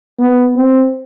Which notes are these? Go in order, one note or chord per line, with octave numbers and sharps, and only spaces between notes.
B3
C4